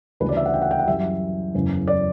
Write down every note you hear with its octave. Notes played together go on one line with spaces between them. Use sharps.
D2 C#3 E3 G3 B4
D5
E5
F#5
G5
F#5
G5
F#5
F#2 E3 G3 E5
F#1 E2 C#3
D5